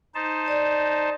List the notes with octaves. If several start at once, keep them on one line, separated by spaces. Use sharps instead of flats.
D#4 C5 A5
D5